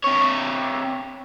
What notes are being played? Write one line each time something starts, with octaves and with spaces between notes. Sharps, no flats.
C3 C#5